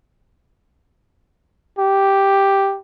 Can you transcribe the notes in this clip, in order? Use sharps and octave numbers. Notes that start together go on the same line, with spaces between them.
G4